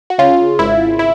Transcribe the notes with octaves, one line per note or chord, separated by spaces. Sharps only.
F#4
C#3 F4
G#1 E4
E4